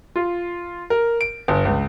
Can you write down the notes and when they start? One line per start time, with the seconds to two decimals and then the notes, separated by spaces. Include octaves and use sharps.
0.16 F4
0.90 A#4
1.21 D7
1.48 G1
1.65 C#2